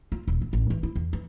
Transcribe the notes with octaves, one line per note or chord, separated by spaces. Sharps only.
F4
D#1
B3
A1
E3
E4
E2
E3